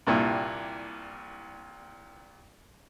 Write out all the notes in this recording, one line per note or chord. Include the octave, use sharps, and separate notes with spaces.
C2 G2 A#2 E4